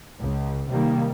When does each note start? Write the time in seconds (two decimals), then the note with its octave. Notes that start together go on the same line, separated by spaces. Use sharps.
0.20 C#2
0.71 C3 D#3 G3 A#3